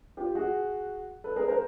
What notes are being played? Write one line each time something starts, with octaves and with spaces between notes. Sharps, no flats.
F4 G4
F#4 G#4
A4 B4
G#4 A#4
A#4 C5